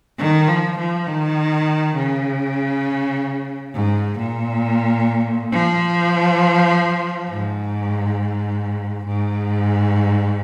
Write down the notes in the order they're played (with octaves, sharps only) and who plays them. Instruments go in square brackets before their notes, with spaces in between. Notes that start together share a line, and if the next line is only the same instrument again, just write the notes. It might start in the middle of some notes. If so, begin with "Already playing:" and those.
[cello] D#3
F3
F3
D#3
C#3
G#2
A#2
F3
G#2
G#2